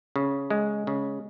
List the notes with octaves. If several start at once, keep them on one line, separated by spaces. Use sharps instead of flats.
C#3
G#3
C#3